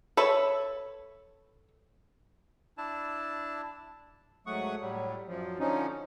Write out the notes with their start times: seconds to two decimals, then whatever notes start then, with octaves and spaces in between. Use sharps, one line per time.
0.17 A4 B4 C#5 E5
2.78 D4 E4 A5
4.47 G#2 F#3 A3 F#5 C#6 D#6
4.81 A2 F#3 G3
5.28 F#2 F3
5.59 D3 F3 C#4 D#4